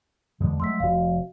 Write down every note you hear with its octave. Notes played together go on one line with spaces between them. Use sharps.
E2 D3 G#3
F#3 G#3 A3 C6 E6 B6
F1 F#4 F5